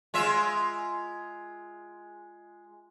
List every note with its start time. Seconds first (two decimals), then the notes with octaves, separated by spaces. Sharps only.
0.14 G#3 F4 E5